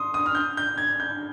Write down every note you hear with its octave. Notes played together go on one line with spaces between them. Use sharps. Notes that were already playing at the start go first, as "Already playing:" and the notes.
Already playing: C6 D#6
D#6
F6
G6
G6
G#6
G6